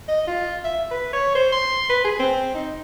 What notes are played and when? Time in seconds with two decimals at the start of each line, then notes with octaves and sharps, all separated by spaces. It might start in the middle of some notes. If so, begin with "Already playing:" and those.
0.08 D#5
0.27 F4
0.65 E5
0.91 B4
1.13 C#5
1.35 C5
1.52 C6
1.90 B4
2.04 G#4
2.19 C4
2.54 D#4